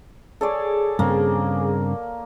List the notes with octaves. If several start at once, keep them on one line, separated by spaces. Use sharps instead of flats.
G#4 A4 C#5 D5
G2 C#3 A#3 C4